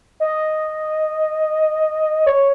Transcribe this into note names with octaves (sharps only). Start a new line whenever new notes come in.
D#5
C#5